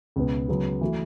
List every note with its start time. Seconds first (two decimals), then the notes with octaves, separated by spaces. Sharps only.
0.16 C#2 B2 B3
0.48 C#2 C#3 F#3 B3
0.81 E3 A3 F#4